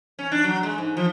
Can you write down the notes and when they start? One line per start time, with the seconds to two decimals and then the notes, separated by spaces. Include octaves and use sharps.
0.19 C#4
0.32 D4
0.44 F#3
0.63 G#3
0.78 G#2
0.97 F3